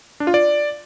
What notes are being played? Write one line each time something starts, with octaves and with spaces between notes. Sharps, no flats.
D4
F4
D5